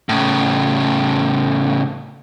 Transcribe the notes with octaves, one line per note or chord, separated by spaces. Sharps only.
A2 C#3